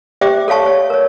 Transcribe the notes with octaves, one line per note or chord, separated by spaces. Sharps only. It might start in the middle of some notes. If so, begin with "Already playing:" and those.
G4 C5 D5 E5 G5 D6
A4 C#5 F5 A5 C#6
C#5
A#4 C#5